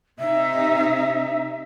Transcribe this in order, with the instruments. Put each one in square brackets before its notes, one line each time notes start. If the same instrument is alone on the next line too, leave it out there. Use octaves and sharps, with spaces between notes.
[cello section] C3 D#4 [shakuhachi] E5